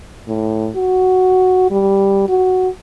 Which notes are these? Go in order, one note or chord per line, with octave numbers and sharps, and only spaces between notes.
A2
F#4
G3
F#4